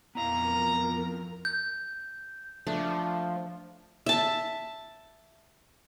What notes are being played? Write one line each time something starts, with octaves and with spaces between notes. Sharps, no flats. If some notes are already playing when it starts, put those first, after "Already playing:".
F2 B3 E4 A#4 F5 A#5
G6
F3 A3 D4
E5 A5